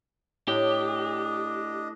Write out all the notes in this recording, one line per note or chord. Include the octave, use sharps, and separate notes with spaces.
A2 D4 G4 D#5